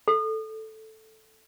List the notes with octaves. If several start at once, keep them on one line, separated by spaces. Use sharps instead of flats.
A4